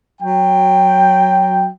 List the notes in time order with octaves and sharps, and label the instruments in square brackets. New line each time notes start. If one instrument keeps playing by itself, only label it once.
[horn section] F#3 G5